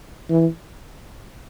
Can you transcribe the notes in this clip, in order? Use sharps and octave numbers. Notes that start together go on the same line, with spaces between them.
E3